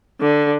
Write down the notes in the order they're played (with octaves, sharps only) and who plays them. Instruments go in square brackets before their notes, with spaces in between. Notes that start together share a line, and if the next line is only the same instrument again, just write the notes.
[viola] D3